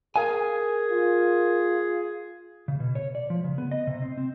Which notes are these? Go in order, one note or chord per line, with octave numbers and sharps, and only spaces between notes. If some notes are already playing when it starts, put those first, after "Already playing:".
G#4 A#4 F5 G#5
F4
C#3
B2
C#5
D5
F3
C#3
B3
D#5
C3
C4
C4